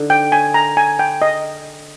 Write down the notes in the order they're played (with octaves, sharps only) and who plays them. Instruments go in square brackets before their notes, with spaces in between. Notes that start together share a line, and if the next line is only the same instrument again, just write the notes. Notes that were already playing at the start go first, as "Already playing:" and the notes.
Already playing: [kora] D3 D#4
[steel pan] G5
G#5
A#5
G#5
G5
D#5